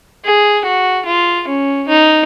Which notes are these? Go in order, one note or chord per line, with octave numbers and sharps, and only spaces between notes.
G#4
F#4
F4
C#4
D#4